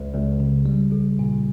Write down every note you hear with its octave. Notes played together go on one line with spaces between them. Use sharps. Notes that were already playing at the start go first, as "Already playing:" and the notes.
Already playing: C#2
C#2
C#3
G3
A#1
A#2